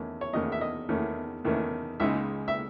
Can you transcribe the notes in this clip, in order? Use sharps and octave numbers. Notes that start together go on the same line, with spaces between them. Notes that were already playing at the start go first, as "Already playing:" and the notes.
Already playing: E2 D#3 A3 C#4
C#5
E2 D#3 A3 C#4 D#5
E5
D#5
E2 D#3 A3 C#4
E2 D#3 A3 C#4
C#2 C#3 G#3 D#4 E5
E5